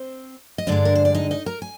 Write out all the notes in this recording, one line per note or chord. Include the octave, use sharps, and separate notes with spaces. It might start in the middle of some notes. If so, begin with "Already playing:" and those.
Already playing: C4 C5
D#5
G2 D3 G#3 D4 D5
A#4
C5
D5
D#4 D#5
D#4 D#5
A#4 A#5
G#5